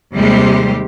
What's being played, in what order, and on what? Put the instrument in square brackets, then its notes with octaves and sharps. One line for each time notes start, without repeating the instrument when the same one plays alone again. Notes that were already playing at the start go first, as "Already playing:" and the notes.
[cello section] D#2 C3 G3 G#3 G4 C5